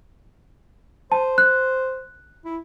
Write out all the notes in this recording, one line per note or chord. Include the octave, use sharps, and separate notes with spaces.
C5 A5
F#6
E4